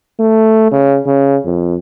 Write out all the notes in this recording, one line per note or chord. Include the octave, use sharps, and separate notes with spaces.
A3
C#3
C#3
F2